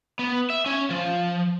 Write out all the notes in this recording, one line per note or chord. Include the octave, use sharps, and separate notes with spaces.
B3
E5
C#4
F3